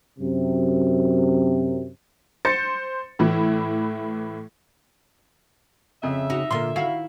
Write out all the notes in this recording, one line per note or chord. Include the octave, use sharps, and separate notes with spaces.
F#2 C3
C5 A6 C#7
A2 E3 E4
F2 C#3 E5
D#4 F#4
A#2 D3 A#3 F4 C6
D#3 E4 F#4 F5